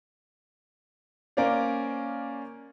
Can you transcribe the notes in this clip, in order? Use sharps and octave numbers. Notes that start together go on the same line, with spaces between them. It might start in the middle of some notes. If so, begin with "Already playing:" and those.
A#3 C#4 A#4 C5 D5 F5